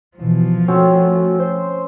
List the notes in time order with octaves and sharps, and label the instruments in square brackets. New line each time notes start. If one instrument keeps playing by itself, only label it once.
[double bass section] B2 E3 [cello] F3
[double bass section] A3 [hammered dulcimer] C4 C#4 C#5 [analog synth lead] F#4
[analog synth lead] C5